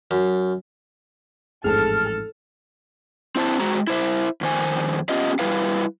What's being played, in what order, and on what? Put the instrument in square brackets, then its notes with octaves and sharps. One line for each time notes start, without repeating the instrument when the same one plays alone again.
[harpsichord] F#2
[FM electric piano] A1 F2 G#2 [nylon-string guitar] G#4 A5 [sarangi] A4 [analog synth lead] F6
[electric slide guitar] C4 E4 C5 A5
G#3 F#4 C5 A#5
E4 C5 E5
F2 D#3 C5 G#5
B3 C#4 F4 G4 D#5 F5
G3 E4 B4 F5